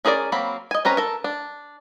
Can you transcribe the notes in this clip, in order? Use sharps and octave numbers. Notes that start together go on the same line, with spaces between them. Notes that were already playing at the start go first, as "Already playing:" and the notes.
C#4 G#4 A#4 C5 D5
F#3 A#3 C4 B5
D#5 G#5
C4 C#4 B4 A#5
A4 A#4
D4